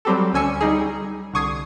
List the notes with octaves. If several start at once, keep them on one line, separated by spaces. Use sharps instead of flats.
F#3 G3 C4 G4 A4
D2 D3 C#4 G#5 E6 C#7
G3 D#4 G#4
C2 D3 C#6 D#6 G#6 C7